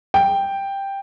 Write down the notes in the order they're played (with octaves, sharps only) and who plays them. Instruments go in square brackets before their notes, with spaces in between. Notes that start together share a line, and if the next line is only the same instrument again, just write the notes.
[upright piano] G5